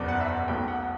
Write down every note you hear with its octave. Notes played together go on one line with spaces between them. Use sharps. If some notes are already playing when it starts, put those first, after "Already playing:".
Already playing: F#1 E2 B2 D5
F#5
E5
F#5
B1 B2 A3 G5
F#5
F#5